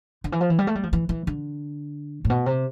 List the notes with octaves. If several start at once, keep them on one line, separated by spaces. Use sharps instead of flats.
D3
E3
F3
E3
G3
A3
G3
F3
E3
E3
D3
A2
B2
C3